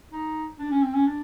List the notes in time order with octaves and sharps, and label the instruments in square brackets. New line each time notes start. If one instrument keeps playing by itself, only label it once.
[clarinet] D#4
D4
C#4
C4
C#4
D4